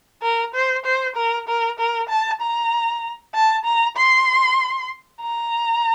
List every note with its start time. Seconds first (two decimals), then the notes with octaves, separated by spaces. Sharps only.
0.23 A#4
0.55 C5
0.85 C5
1.16 A#4
1.48 A#4
1.79 A#4
2.09 A5
2.41 A#5
3.35 A5
3.65 A#5
3.97 C6
5.22 A#5